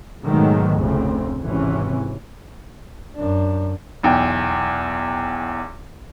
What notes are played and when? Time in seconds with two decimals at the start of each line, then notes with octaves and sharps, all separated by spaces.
0.24 G#2 B2 D#3 F#3 G#3 A3
0.78 F1 D2 A2 C#3 C4
1.44 G#1 C3 E3 C#4
3.16 F#2 D4
4.03 B1 E2 G5